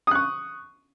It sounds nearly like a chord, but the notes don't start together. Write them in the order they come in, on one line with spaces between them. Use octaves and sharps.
D#6 F#6 C#6